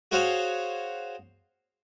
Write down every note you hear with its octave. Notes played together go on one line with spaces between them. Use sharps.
F#4 G#4 C5 C#5 F5 F#5